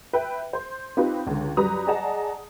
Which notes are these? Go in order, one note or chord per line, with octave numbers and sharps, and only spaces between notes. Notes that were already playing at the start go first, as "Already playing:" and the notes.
B4 E5 G5
C5 C6
C4 D#4 F4 G4 B4
C#2 D3
F#2 G3 B4 A#5 D#6
G#4 D5 D#5 F#5 A5 A#5